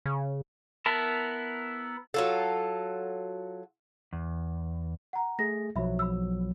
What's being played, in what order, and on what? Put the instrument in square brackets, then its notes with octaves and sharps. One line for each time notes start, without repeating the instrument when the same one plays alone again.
[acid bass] C#3
[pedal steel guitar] B3 E4 A#4 A5
[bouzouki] F#3 F4 A4
[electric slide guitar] E2
[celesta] F#5 A#5
[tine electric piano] A3 G#4 [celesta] A#6
[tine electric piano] B1 F3 F#3 [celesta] E5 B5
[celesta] B5 E6